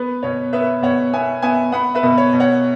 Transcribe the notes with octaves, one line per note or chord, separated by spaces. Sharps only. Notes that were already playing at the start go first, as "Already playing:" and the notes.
Already playing: B3 B4
B2 C#5
B3 B4 E5
B2 C#5 F#5
B3 E5 G#5
B3 E5 G#5
B3 F#5 B5
B4 E5
B2
C#5
B2
C#5 F#5